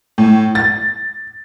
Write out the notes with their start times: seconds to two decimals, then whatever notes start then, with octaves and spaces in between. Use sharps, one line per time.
0.18 A2
0.55 A6